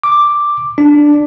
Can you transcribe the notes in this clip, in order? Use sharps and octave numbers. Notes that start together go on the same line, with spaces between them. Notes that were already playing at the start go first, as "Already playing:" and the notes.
D6
D4